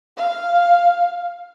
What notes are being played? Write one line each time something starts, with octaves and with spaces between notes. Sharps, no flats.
F5